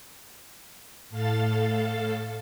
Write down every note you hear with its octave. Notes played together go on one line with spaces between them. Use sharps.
A2 A4 F5 A6